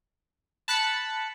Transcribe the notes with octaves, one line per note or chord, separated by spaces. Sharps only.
A5 B5 F#6 A6 B6 C#7